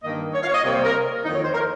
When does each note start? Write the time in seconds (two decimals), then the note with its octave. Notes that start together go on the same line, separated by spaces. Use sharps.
0.03 G2 D#3 A#3 D#5
0.34 C#5
0.43 F5
0.49 C#5
0.54 D#5
0.64 C3 G3 A#3 C#5
0.74 C5
0.84 A#4
1.24 F2 D#3 A#3 D#4
1.35 C#5
1.44 C5
1.54 A#4